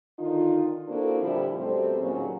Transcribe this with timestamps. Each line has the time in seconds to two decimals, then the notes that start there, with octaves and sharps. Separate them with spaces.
0.19 D3 D#3 D#4 F4
0.88 A#3 C4 D4 E4 F#4 A4
1.21 A#2 D3 F3 G3 E4
1.57 F#2 B2 G3 A3 C4
2.01 D#2 A#2 C#3 F#3